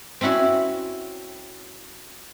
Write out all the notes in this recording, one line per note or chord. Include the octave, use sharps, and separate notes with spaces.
C4 C#4 E4 F#4 C#5